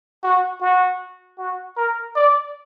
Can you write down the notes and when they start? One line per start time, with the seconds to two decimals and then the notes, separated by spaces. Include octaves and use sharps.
0.24 F#4
0.61 F#4
1.39 F#4
1.77 A#4
2.16 D5